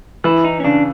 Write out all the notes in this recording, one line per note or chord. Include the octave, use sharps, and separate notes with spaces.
E3 E4
D#4
C#4
C#3 D4